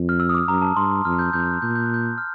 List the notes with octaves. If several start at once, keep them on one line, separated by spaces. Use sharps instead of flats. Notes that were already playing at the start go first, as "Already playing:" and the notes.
Already playing: F2
F6
E6
D#6
D6
F#2 A#5
A5
G2 C6
F2 F6
G6
F2 G6
F#6
A#2 G6
G6
F#6
G6
F6